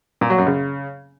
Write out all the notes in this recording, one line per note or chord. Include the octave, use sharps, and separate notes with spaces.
A#2
F#3
F#2
C#3